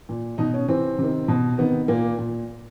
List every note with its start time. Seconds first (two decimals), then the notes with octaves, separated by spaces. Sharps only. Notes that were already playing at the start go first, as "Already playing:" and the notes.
0.09 A#2
0.38 B2 D#4
0.54 C#4
0.68 C3 E3 C4
0.98 C3 D#3
1.28 B2
1.58 C3 D#3 B3
1.88 A#2 A#3
2.18 A#2